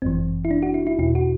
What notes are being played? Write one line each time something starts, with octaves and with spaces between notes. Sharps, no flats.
G1 F#2 E3 C4
E4
D4
F#4
E4
E4
E2 B2 E4
F#4